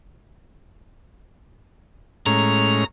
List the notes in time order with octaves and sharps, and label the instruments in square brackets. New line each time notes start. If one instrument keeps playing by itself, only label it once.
[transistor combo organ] A2 G#3 C#4 [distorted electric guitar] A#5